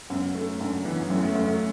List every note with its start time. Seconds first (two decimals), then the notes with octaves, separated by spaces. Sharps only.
0.10 F#2 B3
0.35 A3
0.60 F#2 D4
0.85 E3 B3
1.03 F#3
1.10 F#2 A3
1.23 A3
1.35 F#2 A3
1.47 A3